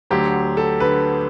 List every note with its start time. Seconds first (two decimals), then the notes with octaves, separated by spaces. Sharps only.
0.11 D2 D3 F#3 G4
0.57 A4
0.80 D3 B4